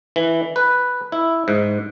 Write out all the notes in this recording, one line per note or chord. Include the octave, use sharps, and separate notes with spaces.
E3
B4
E4
G#2